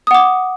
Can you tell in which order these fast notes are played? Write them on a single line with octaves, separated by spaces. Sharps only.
D#6 F#5 D6